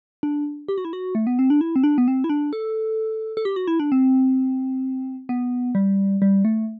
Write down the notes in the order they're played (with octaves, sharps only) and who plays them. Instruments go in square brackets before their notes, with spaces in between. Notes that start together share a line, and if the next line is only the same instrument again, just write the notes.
[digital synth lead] D4
G4
F#4
E4
F#4
A3
B3
C4
D4
E4
C4
D4
B3
C4
E4
D4
A4
A4
G4
F#4
E4
D4
C4
B3
G3
G3
A3